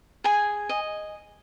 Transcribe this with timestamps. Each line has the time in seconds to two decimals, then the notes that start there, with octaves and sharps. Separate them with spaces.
0.24 G#4 G#5
0.69 D#5